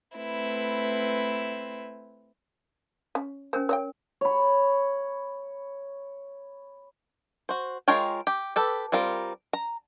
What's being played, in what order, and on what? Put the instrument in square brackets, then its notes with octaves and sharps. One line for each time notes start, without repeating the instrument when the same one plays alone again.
[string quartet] A3 C4 E4 B4
[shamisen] C#4
[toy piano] C#4 A#4 G#5 [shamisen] C5
[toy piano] A#4 [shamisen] C#5 D#5 G5
[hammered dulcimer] C#5 B5
[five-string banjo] F#4 C5
G#3 F4 A#4 C#5 G5
G4
G4 A4 B4
G3 C4 F4 A#4
A#5